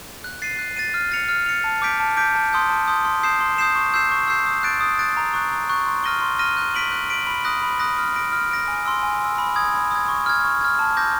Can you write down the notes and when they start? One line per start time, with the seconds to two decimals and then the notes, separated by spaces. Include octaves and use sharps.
0.24 F#6
0.42 A6 C7 D#7
0.59 F#6
0.77 A6 C7 D#7
0.94 F6
1.12 A6 C#7 F7
1.29 F6
1.46 A6 C#7 F7
1.64 A5
1.82 D6 G6 B6 D7
2.00 A5
2.17 D6 G6 B6 D7
2.35 A5
2.53 C6 D#6 G6
2.70 A5
2.88 C6 D#6 G6
3.05 C6
3.23 D#6 G6 C7 E7
3.40 C6
3.58 D#6 G6 C7 E7
3.75 C#6
3.94 E6 G6 C7 E7
4.11 C#6
4.28 E6 G6 C7 E7
4.46 D#6
4.63 F#6 A6 D7
4.80 D#6
4.99 F#6 A6 D7
5.17 A#5
5.33 C#6 F#6
5.51 A#5
5.69 C#6 F#6
5.86 C6
6.04 F6 A#6 D#7 G7
6.22 C6
6.39 F6 A#6 D#7 G7
6.57 F#6
6.74 B6 D7 F#7
6.92 F#6
7.10 B6 D7 F#7
7.27 B5
7.45 D#6 F#6 A#6
7.63 B5
7.80 D#6 F#6 A#6
7.98 F6
8.16 A#6 D7
8.32 F6
8.51 A#6 D7
8.68 G#5
8.86 C6 E6
9.03 G#5
9.20 C6 E6
9.38 B5
9.56 D#6 G#6
9.74 B5
9.91 D#6 G#6
10.08 C#6
10.26 F6 G#6
10.44 C#6
10.61 F6 G#6
10.79 A5
10.97 D6 G6 A#6